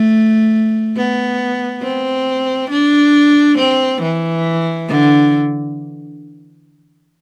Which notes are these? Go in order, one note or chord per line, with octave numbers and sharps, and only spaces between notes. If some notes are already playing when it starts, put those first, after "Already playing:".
Already playing: A3
B3
C4
D4
C4
E3
D3